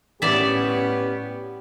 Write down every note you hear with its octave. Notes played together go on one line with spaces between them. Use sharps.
A2 B3 C#4 G4 D5 E5